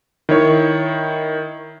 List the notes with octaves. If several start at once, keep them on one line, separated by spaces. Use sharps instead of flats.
D#3 E4 C#5